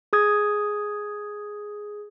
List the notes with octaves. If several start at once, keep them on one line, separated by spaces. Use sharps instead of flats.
G#4 D#6 G#6